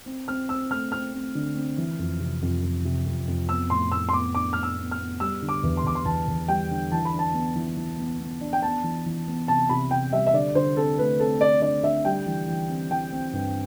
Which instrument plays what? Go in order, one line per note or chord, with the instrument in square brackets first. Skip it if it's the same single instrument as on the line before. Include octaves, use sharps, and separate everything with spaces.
[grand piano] C4
[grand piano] C4 [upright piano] F6
[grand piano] C4 [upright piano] E6
[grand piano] A3 [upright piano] F6
[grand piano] C4 [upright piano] F6
[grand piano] C4
D3
C4
E3
F2
C3
F2
F2
C3
F2
F2
[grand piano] B3 [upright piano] E6
[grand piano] A2 [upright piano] C6
[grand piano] A2 [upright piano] E6
[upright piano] C6
[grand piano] B3 [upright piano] D6
[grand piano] D4 [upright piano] D6
[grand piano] B3 [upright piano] F6
[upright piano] E6
[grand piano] B3
[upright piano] F6
[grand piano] B3
[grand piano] G3 [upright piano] E6
[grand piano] D3
[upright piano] D6
[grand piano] E2
[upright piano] C6
[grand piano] E2 [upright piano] D6
[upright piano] C6
[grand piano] E2 [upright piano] A5
[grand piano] E2
[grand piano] G3 [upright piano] G5
[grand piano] D3
[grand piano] E3 [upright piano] A5
[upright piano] B5
[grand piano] D4
[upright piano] A5
[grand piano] B3
E3
E3
B3
B3
D4
[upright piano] G5
[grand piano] B3 [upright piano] A5
[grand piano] E3
E3
B3
[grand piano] C3 [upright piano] A5
[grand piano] C3 [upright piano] B5
[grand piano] C3 [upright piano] G5
[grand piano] G3 [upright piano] E5
[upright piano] E5
[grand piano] D3 [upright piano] D5
[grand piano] D3 [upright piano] C5
[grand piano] C4 [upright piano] A4
[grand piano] A3 [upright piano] B4
[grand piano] C4 [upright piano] A4
[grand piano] C4 [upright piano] D5
[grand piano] D3 [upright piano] D5
[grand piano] D3 [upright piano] E5
[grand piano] G3 [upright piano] G5
[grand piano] E3
E3
C4
[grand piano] E3 [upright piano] G5
[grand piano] C4
G2